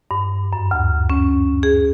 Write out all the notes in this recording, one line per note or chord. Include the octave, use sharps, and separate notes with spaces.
G2
F#2
D2
C#4
G#4